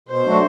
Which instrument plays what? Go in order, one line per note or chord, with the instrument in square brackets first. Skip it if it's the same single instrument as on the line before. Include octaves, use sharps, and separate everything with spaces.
[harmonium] B2 [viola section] C5
[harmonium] F#3 A3 D4 F#4